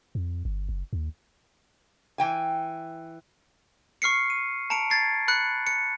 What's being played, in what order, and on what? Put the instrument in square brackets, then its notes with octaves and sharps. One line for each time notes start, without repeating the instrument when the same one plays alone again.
[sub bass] F2
G1
F#1
D#2
[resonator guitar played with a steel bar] E3 G5 G#5
[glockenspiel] C#6 F6 C7 C#7
D#7
A5 A#5 C#7 D7
G#6 A6 C7
B5 F#6 C#7
C#7